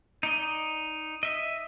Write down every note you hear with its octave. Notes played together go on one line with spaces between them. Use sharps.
D#4 D5 D#5
D#5 E5